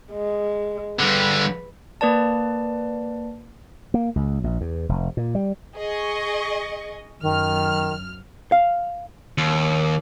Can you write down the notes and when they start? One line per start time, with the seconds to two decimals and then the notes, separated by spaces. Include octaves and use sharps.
0.12 G#3
0.99 G2 D3 B4
2.01 A#3 B4 D5 A5
3.94 A#3
4.16 C#2
4.44 A#1
4.61 E2
4.89 F1
5.17 A#2
5.35 G3
5.76 G#4 D#5 C#6
7.22 F#2 D#3 F6
8.52 F5
9.38 D#2